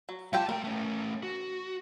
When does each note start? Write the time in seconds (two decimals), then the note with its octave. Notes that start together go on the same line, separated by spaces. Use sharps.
0.09 F#3
0.33 F#3 F4 G4 G5 A5
0.49 A3 A#4 G5
0.64 A3 C#4
1.23 F#4